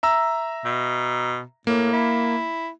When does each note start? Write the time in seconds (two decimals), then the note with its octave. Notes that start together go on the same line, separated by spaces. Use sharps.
0.03 E5 A#5 E6
0.65 B2
1.67 A2 A#3
1.93 E4